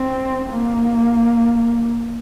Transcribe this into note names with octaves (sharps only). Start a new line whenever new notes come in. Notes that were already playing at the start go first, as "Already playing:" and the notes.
Already playing: C4
A#3